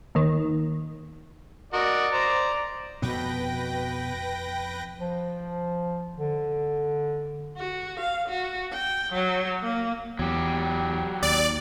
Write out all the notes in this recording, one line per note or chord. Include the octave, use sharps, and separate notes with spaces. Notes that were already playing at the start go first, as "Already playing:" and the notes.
D#2 D#3
F#4 A#4 D5 D#5
C5 A#5
F2 B2 B3 B4 G5 A#6
F3
D3
F#4
F5
F#4
G5
F#3
A#3
E2 F#3 G4
D#2 D5